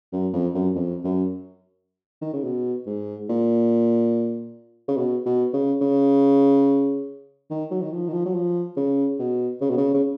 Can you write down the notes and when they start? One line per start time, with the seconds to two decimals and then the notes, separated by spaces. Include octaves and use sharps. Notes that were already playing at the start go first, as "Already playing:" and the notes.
0.13 F#2
0.33 F2
0.54 F#2
0.75 F2
1.04 F#2
2.21 D#3
2.33 C#3
2.44 B2
2.87 G#2
3.29 A#2
4.88 C#3
4.97 B2
5.26 B2
5.53 C#3
5.81 C#3
7.50 D#3
7.71 F#3
7.82 D#3
7.93 F3
8.08 D#3
8.13 F3
8.26 F#3
8.34 F3
8.77 C#3
9.19 B2
9.61 C#3
9.70 B2
9.78 C#3
9.94 C#3